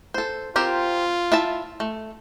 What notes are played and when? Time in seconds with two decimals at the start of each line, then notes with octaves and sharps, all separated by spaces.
0.14 A4 C5
0.56 C4 F4 G4 A#4
1.32 E4 E5 A5
1.80 A3